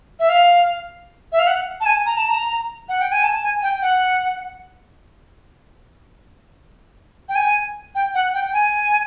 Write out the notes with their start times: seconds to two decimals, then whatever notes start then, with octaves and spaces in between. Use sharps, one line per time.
0.19 E5
0.29 F5
1.32 E5
1.39 F5
1.47 F#5
1.81 A5
1.86 G#5
2.06 A#5
2.17 A5
2.28 A#5
2.89 F#5
3.01 G5
3.12 G#5
3.24 A5
3.43 G#5
3.63 G5
3.82 F#5
7.29 G5
7.35 G#5
7.95 G5
8.15 F#5
8.34 G5
8.53 G#5